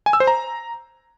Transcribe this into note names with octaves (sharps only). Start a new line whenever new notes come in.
G#5
E6
C5
A#5